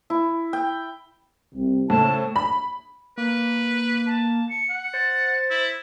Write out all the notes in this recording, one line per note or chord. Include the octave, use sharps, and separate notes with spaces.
E4
G5
C2 C3
A2 C#3 A3 C5 A5
B5
A#3 B4
A5
C#7
F#5
C5 A6
E4